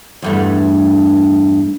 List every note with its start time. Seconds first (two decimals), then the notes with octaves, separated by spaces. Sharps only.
0.22 E2 G2 A3